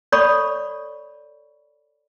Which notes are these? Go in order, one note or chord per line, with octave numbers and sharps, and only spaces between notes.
A4 C#5 D5 B5 C#6